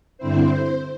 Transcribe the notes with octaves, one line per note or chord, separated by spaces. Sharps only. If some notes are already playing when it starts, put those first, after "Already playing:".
G2 D3 C4 E4 C5